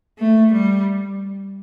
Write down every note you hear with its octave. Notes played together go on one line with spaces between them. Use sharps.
A3
G3